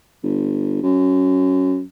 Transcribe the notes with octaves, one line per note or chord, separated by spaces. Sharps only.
G1
F#2